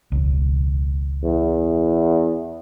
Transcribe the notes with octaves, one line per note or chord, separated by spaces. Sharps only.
E1 C#2
E2